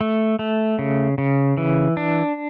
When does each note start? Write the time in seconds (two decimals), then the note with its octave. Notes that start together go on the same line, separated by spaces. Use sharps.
0.01 A3
0.39 A3
0.79 C#3
1.18 C#3
1.57 E3
1.97 D4